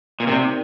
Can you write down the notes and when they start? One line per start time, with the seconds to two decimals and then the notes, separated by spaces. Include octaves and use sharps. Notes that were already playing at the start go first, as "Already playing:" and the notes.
0.20 A#2
0.27 C3 D#4 A#4 D5